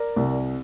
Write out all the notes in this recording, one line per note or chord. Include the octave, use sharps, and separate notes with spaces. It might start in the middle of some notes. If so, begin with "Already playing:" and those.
Already playing: A#4 D5
C2